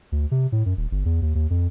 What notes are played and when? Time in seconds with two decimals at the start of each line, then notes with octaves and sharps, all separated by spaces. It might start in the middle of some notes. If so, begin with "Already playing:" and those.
0.12 D2
0.31 C3
0.52 A2
0.66 F#2
0.77 D#1
0.91 G1
1.05 E2
1.22 D#2
1.35 D#2
1.50 F2